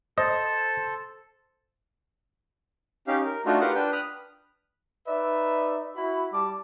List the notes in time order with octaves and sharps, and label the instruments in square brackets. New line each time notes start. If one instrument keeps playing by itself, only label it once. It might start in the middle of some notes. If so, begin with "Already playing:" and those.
[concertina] A4 [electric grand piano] C5 [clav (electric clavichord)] D#5
[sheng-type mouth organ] C#4 D#4 G4 F5
A#4
A3 D4 D#4 F4 F#4
F4 G4 A#4 B4 F5 F#5
D4 B4 G5
B5 D#6 F6 F#6
[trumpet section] D#4 B4 D5 E5
E4 F#4 B5
G3 A5 D6